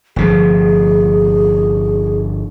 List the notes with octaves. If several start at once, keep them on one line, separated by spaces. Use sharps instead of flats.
G1 C3 F3 G#4